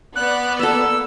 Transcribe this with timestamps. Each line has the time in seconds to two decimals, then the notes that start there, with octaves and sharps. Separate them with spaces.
0.16 B3 D5 F#6
0.59 A#3 A4 E6